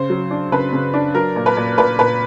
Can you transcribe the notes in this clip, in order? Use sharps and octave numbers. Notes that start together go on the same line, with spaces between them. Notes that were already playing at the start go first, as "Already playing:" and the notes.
Already playing: C#3 C5
F#3
D4
C#3 B4
C#3
D4
F#3 A#4
A#2
B4
A#2
A#2 B4
A#2 B4